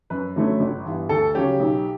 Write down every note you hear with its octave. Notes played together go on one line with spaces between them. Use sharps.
F#2 B4
D3 F#3 A3 C#4
G1
G2 E3 B3
D2 A4
C#3 F#3 C#4 G4
B1